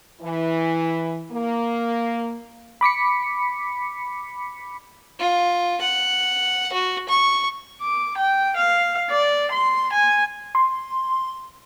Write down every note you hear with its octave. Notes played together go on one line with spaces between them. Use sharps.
E3
A#3
B5 D6 B6 C#7
F4
F#5
F#4
C#6
D6
G5
F5
D5
C6
G#5
C6